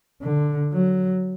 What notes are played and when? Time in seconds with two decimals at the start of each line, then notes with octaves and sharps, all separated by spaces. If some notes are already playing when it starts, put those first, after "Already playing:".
0.22 D3
0.73 F#3